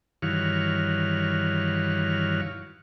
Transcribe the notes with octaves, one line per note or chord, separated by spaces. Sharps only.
G2 D#3 E3 F#4 C#5 F5